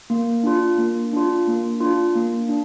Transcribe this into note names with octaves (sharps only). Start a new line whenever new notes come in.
A#3
D4 F4
A#3
D4 F4
A#3
D4 F4
A#3
D4